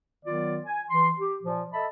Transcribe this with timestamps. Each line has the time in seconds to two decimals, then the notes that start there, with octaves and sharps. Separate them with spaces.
0.25 D#3 F#3 B3 F4 D5
0.66 G#5
0.90 E3 C6
1.20 G4
1.43 A#2 F3
1.73 A4 D#5 E5 A5 B5